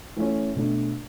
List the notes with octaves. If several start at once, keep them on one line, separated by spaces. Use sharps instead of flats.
E3 A3 C#4
B2 A3 D4